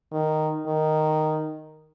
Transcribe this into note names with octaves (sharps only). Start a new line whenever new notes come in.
D#3
D#3